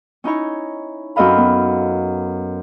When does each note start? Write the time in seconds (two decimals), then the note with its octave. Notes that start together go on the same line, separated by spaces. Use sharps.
0.24 C#4 D#4 E4 C#5
1.16 F#2 C4 A4 D#5 F5 B5
1.38 B3